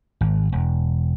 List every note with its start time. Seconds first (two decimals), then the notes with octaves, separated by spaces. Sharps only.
0.21 G#1
0.52 E1